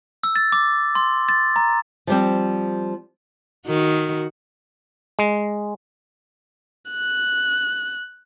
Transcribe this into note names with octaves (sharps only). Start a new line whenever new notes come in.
E6
A6
D6
C6
A6
A#5
F3 G3 C4
D#3 F#4
G#3
F#6